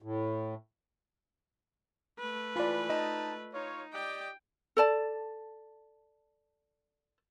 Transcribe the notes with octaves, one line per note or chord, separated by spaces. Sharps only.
A2
A3 B4
E3 F4 D5 B5
D#4 D#5 A5
D#4 F4 C#5
G4 D5 D#5 G5
A4 D5 A5